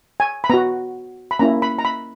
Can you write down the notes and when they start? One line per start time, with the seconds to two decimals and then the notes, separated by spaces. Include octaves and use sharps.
0.20 G#5
0.44 B5
0.50 B3 F#4 A#5
1.31 B5
1.39 A#3 C#4 E4 A#5
1.62 B5
1.79 A#5
1.85 B5